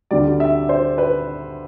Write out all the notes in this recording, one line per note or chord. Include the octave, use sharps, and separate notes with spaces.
D2 D3 G3 D5
E5
C5
B4